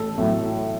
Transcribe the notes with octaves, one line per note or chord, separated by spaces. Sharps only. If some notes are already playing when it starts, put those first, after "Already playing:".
Already playing: A1 A4
A2 F#3 A3